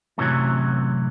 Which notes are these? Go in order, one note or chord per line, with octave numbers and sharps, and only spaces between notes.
F#2 A2 C3 E3 F#3